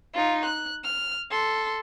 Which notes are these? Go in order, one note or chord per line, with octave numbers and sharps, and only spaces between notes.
D#4 F4
F#6
F6
A4 C6